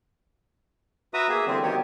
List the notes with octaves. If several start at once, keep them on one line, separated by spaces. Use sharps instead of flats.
F#4 B4 E5 A#5 D#6
A#3 G#4 E5
D3 E3 G3 C4
D#3 F#3 B3 G4 C#5